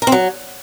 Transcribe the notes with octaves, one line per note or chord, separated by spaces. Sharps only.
A#4
C4
F#3